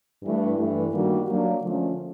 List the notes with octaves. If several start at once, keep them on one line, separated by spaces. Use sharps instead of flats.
G2 E3 A3
G2 E3 A3
D#3 G3 A#3 D4 F#4
F#3 A#3 D4
D3 F3 A3 C#4